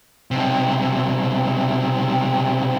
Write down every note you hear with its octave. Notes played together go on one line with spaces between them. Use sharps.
B1 C3